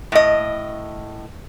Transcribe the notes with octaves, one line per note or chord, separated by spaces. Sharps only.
A2 D#5